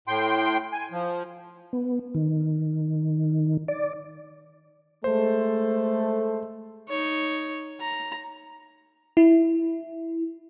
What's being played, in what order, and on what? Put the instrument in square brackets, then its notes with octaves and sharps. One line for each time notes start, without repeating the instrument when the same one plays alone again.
[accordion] A2 G5 C6
G#5
F3
[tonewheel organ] B3
D#3
D5
[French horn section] G#3 A4 [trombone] A3 [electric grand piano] C5
[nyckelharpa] D#4 C#5
A#5
[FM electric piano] E4